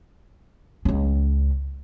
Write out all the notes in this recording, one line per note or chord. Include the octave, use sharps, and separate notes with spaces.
C#2 C#4